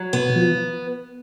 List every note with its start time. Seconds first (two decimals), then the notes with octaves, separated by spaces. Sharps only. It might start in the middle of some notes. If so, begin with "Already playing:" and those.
Already playing: F#3
0.13 B2 B3
0.35 F3